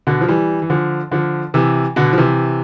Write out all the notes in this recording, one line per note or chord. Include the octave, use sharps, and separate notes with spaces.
B2 D3
F3
E3 G3
E3
D3 F3
D3 F3
C3 E3
B2 D3
F3
C3 E3